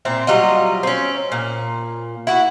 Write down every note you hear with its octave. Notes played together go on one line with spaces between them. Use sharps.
A#2 C4 E4
F#3 G3 F4 D#5
C4 C#4
A#2
E4 F#4